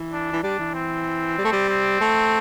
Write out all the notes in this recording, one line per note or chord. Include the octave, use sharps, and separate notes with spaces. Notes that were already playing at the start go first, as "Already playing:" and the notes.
Already playing: E3
D4
E3
G3 D4
E3
C4
G3
A3
G3
C4
A3